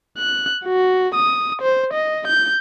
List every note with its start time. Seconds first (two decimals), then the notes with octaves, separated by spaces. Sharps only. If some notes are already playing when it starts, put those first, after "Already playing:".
0.18 F#6
0.65 F#4
1.15 D#6
1.62 C5
1.94 D#5
2.28 G6